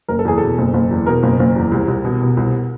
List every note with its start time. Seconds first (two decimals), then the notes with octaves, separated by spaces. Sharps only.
0.08 F#1 A#4
0.19 A4
0.25 E2 G#4
0.38 B2 A4
0.58 F#1
0.74 F#1
0.91 E2
1.06 B2 A#4
1.23 F#1
1.40 F#1
1.56 E2
1.72 C2
1.88 C2
2.05 B2
2.21 B2
2.37 C2